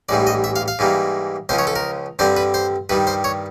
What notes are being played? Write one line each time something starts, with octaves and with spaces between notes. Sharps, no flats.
A1 G#2 E3 G3 D5
D#5
E5
F5
F5
G#2 E3 G3 A#3
C#2 C#3 F3 C5
C#5
A4
A#4
G2 D3 G3 C4 C5
B4
C5
G2 D#3 G3 B4
C5
C#5